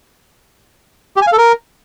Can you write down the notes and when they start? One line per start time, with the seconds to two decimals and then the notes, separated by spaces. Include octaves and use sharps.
1.16 G4
1.22 G#5
1.27 F5
1.32 A4
1.38 A#4